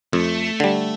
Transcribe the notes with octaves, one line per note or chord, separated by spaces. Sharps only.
F2 A3
D3 G3